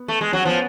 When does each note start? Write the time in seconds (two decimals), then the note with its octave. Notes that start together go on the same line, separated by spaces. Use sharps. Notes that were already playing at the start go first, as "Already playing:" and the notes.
Already playing: B3
0.08 A3
0.21 G#3
0.32 F#3 C#4
0.45 F3 B3